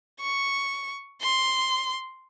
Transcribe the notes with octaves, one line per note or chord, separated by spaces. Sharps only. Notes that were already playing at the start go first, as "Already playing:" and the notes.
C#6
C6